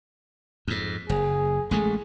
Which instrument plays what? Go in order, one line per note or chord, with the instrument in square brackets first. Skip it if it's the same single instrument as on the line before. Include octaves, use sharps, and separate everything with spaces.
[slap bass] F2 G#2
[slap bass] F#1 [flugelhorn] G#4
[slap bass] A1 G#3 A3 [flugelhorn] G#4